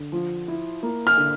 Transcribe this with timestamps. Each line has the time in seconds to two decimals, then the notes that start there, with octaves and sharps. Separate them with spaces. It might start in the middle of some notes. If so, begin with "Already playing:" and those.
Already playing: D3
0.12 F3
0.48 E4
0.83 A#3
1.07 F6
1.17 D3